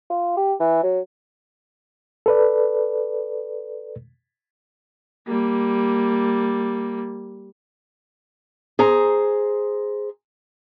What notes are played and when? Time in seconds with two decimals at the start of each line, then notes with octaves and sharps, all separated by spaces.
0.10 F4
0.37 G4
0.60 E3
0.84 F#3
2.26 A4 B4 D5
5.27 G3 A#3
8.79 G#4 C5 A#5